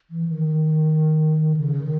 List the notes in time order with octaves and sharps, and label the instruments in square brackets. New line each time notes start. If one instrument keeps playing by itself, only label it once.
[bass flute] E3
D#3
C#3
D#3